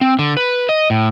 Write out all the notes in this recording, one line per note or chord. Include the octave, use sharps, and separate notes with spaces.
C4
D3
B4
D#5
A2